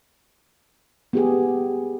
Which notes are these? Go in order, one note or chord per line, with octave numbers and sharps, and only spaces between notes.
B3 G4 G#4